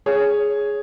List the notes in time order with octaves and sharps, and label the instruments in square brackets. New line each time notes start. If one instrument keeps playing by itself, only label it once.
[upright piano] G#4 C#5